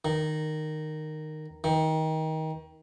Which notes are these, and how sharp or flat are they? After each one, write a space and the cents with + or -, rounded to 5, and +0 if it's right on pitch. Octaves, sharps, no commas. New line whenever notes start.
D#3 -10
D#3 +25